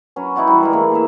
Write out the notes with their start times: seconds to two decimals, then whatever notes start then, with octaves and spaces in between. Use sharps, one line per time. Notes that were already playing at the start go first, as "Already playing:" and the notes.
0.16 F#3 C#4 B4
0.36 D#4 E4 F#4 D5
0.47 E3 G3
0.61 D#3 G#3 A#4
0.73 E3 A3 A#3
0.91 G#4 A#4 E5